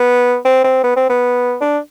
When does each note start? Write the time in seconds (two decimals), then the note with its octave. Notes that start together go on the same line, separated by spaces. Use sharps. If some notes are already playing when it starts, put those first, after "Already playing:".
Already playing: B3
0.45 C4
0.64 C4
0.84 B3
0.96 C4
1.10 B3
1.61 D4